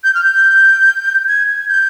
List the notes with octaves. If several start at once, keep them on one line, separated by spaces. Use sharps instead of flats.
G6
F6
G6
G#6
G#6
G6